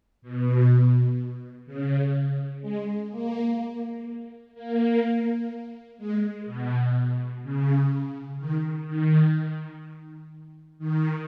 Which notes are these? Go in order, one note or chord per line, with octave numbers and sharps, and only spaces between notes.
B2
C#3
G#3
A#3
A#3
G#3
B2
C#3
D#3
D#3
D#3